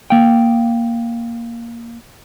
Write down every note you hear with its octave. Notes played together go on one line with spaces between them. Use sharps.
A#3 F5 G5